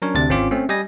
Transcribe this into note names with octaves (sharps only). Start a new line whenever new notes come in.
F#3 C#4 D4 A#4 C#5
D2 C3 D4 A6
G#1 C4 C#4 F4 D6
A3 C4 C#4
G3 D#5 G#5 A#6